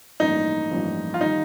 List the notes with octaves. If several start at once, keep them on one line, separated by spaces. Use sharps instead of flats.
A1 G2 F3 A#3 D#4 F4
A1 G2 F3 A#3 F4
F4
D#3 G3 D#4